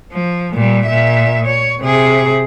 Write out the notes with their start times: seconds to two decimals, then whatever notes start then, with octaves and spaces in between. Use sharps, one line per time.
0.13 F3
0.53 A#2 G3
0.86 A#2 E5
1.45 C#5
1.82 C3 G#4